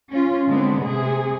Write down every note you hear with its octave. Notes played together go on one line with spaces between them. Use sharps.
C#4 F4
D3 G#3 A3 B3 C4
C3 G#4